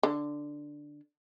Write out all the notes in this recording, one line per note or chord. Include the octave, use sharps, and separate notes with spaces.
D3